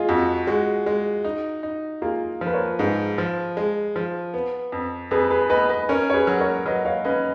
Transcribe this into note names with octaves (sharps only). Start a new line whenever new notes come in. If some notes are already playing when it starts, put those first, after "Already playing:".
Already playing: F4 G#4 D#5
F2 F#4
G#3 F#4
G#3
D#4
D#4
A#3 F4 G#4
F3
B4
A#4 C#5
G#2 G#4 B4
F3
G#3
F3
B3
F2
F2 G#4 B4
G#4 B4
B3 B4 D#5
B4 D#5
C#4 A#4 C#5
C#5
G#4 B4
F#3
A#4 C#5
F#3 B4 D#5
C#5 F5
C#4 B4 D#5